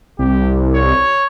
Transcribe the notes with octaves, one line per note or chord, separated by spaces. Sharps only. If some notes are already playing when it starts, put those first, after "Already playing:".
C2 G4
C#5